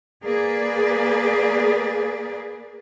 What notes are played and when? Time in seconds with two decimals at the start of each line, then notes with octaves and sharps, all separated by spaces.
0.24 A#3 G#4 B4 D5